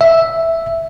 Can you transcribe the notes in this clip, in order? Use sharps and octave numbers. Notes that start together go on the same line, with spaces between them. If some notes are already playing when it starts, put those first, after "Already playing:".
E5